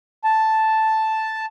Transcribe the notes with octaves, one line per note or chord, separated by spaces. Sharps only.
A5